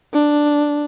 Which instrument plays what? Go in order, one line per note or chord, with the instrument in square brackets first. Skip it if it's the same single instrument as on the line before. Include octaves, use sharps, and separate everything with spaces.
[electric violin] D4